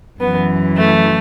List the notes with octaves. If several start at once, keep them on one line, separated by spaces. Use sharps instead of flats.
F#2 E3 B3
A3